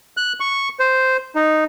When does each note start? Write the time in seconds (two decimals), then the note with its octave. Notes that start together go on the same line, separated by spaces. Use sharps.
0.17 F#6
0.40 C#6
0.80 C5
1.35 D#4